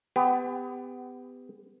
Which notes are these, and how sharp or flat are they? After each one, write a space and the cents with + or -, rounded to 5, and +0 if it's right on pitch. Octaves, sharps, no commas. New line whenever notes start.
B3 +30 G4 +30